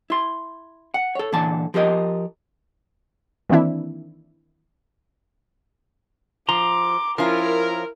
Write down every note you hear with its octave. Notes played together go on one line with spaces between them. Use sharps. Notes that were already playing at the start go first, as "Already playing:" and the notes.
E4 C6
F#5
A4 C#5
A#2 D3 E3 A5
F3 G4 A#4 D#5
D#3 E3 A#3 C4 D4 E4
F3 A#5 C6 D6
F3 C#4 E4 F4 A#4